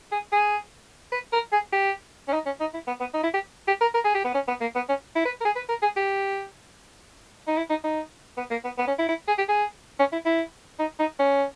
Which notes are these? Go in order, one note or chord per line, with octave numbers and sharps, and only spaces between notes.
G#4
G#4
B4
A#4
G#4
G4
C#4
D#4
C#4
D#4
E4
B3
B3
D#4
E4
G4
G4
A#4
A#4
G#4
G4
B3
C#4
B3
A#3
B3
C#4
E4
B4
A#4
G#4
B4
A#4
G#4
G4
D#4
E4
D#4
D#4
B3
A#3
B3
B3
C#4
E4
E4
G#4
G4
G#4
C#4
E4
E4
D#4
D#4
C#4